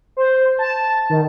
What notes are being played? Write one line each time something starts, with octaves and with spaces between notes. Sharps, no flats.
C5
A5
D#3